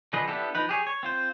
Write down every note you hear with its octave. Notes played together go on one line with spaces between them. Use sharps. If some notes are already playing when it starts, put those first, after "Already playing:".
D3 F3 G#4 B4 D#5
B3 D4 E4 G4 A4
F3 D#4 B4
G4 G#4 C#5
C#5
C4 F4 C5